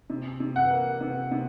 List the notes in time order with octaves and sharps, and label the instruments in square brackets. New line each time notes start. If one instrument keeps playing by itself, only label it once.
[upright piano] C3
C3
[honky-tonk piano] F#5
[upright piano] A#3
C3
C3